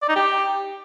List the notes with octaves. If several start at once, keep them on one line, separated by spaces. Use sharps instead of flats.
D5
D#4
G4